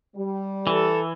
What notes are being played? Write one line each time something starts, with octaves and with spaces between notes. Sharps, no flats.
G3
E3 A4